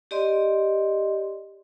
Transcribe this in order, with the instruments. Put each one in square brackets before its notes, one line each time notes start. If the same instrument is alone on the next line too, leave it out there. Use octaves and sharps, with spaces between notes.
[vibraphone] G4 D5 D#5 C6